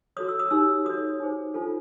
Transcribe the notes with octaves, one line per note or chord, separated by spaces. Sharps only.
F#4 A4 C#5 D#6
E6
D#6
D#4 G4 A#4 C#5 E6
F#4 A4 C#5 D#6
D#4 G#4 C5
D4 F4 A4 C5